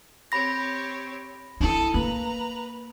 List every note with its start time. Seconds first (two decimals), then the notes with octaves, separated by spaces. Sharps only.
0.32 C4 G4 C#5 B5 A#6
1.61 D4 E4 A4 D#6
1.94 A#3 B4 A#5